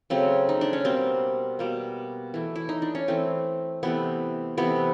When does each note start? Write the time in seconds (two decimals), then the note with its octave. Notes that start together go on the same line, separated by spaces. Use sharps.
0.10 C#3 F#3 A3 C4
0.49 D#4
0.61 D4
0.73 C#4
0.85 B2 G3 A#3 C4
1.59 B2 G3 A#3
2.34 E3 A3
2.56 E4
2.69 D#4
2.82 D4
2.95 C#4
3.08 E3 A3 C4
3.83 C3 E3 A3 B3
4.57 C3 E3 A3 B3